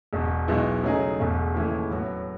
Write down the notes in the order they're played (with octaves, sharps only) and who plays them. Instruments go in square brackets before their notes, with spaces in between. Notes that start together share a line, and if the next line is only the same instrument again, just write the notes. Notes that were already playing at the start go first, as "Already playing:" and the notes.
[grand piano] E1 E2 B2
B1 B2 G#3 B3 E4
C#3 F#3 A3 D#4 G#4
E1 E2 B2 A3
D#2 C#3 E3 A3 E4
A2 F#3 B3 F#4